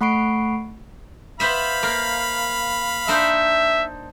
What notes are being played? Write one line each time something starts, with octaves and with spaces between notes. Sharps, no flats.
A3 F#5 B5 C#6 C7 D7
B3 C5 E5 F5 B5
A#3
D4 D#4 C5 E5